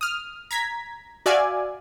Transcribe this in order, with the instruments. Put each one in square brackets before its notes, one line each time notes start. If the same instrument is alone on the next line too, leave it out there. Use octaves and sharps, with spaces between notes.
[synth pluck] D#6 F6
A#5 G#6 B6
F#4 D5 E5 F5 G#5